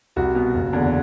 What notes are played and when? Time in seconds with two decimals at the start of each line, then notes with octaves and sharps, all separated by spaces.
0.16 C2 F#4
0.35 B2
0.54 F#1
0.73 E2 D3